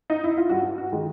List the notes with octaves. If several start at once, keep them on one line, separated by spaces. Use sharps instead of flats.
D#4
E4
F4
G2 F#4
F#4
D#3 G#3